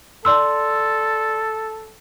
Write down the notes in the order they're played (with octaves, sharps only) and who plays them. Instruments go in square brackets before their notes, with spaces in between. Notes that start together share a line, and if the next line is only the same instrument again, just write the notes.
[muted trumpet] A4 [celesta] D5 C6 E6